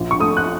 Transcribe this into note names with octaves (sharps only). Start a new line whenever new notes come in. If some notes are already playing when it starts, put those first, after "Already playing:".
Already playing: A#1
C#6
A3 D#6
F#6